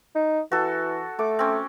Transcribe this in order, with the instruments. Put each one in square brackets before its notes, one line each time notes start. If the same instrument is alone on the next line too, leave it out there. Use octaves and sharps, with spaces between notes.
[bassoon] D#4
[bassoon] E3 [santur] F#4 A4
[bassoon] A3 [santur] D6
[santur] C4 C#4